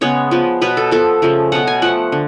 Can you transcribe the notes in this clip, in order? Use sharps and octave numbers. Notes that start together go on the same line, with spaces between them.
C#3 G#3 B3 C#5
F3 B3
B2 F#3 B3 B4
A4
F3 B3 A4
C#3 F3 A3
B2 F#3 B3 F#5
G#5
F3 A3 F#5
D3